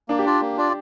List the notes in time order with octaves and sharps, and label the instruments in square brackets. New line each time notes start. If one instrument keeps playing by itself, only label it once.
[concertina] A#3 [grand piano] D4
[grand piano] G4
[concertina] D4 F4 D5
A#3
D4 F4 D5